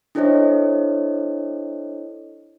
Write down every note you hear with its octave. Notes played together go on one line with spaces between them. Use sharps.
D4 E4 A4 C5 C#5 D#5